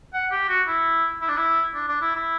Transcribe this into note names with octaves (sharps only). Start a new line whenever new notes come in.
F#5
G4
F#4
E4
E4
D4
E4
D4
D4
E4
E4